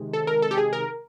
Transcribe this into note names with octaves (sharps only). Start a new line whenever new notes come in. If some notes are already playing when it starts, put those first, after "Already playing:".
Already playing: C3 D#3 G#3
A4
A#4
A4
G4
G#4
A#4